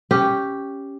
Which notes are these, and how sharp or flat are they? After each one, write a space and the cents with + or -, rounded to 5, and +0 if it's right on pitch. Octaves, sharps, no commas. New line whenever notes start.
C#4 +0 G4 +0